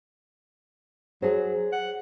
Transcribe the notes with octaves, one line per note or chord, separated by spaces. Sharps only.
F#3 G#4 C5
F#5